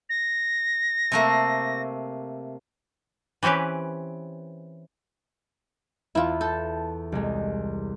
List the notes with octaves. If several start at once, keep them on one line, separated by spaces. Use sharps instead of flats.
A#6
C3 A3 A#3
E3 C4 C#4 G4 B4
E2 E4 F4
A4 A5 G6
C2 G#3